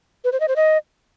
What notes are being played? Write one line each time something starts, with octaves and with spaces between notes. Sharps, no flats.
B4
C5
D#5
C5
D#5